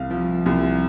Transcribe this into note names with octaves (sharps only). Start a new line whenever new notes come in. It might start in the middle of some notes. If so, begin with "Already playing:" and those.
Already playing: C2 F5
F3
C2